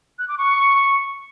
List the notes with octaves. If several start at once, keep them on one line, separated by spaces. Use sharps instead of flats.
F#6
D6
C#6